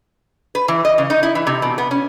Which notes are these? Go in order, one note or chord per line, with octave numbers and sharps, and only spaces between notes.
B4
E3
D#5
C#3
D#4
E4
E3
C3
B2
B3
C#4